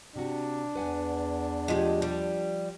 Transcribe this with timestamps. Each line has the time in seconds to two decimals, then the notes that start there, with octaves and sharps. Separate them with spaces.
0.16 C3 D4 F#4
0.75 E2 B4 F#5 G#5
1.68 A2 C3 F3 G#3 F4 G4
2.02 G3